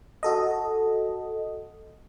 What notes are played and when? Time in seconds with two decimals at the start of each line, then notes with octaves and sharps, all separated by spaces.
0.23 F#4 A4 D#5